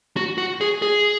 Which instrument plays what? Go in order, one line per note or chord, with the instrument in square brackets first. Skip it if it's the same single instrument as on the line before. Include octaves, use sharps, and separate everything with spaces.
[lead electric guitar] F#4
F#4
G#4
G#4